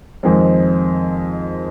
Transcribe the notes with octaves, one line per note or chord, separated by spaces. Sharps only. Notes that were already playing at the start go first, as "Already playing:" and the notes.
F2 D#3 G#3 C4